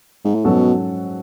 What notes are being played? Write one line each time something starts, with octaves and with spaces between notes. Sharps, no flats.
G#2
A2
G#2 B2 F#3 C#4 F#4 A4